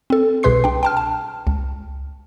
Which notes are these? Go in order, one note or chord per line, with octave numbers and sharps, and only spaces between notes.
C4 A4
C2 B2 G#4 B4 C6 C7
D4 G5
G5 A5 F6
A5
C#2